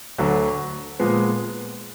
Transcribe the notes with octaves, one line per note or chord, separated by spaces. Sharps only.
D2 D3 F#3
A#2 F3 G#3 B3